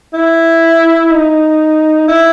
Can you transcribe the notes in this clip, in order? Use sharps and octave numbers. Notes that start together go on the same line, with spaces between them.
E4
D#4
E4